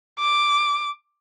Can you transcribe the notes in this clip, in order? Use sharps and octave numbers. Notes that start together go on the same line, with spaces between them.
D6